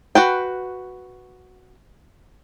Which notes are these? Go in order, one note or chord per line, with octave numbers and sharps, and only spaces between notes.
F#4 B4 G5